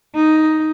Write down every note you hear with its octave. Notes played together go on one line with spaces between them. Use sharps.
D#4